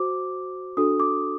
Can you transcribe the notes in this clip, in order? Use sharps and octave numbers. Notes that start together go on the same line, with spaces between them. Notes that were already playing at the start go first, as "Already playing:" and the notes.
Already playing: F#4 C5 D6
D4 F#4 A4 D#6
D6